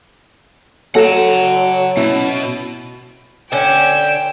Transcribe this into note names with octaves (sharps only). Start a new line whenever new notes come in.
F#3 F#4 A4 F#5 A5
B2 C#4 E4
D3 C#4 G5 E7